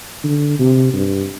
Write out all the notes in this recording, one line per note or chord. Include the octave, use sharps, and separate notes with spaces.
D3
C3
G2